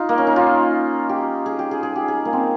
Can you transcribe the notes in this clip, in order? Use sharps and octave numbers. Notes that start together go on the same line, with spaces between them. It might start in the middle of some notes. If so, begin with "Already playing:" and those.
Already playing: D#4 F4
A#3
C#4
D#4
F4
G4
G#4
G4
G#4
G#4
G4
G#4
A#3
C4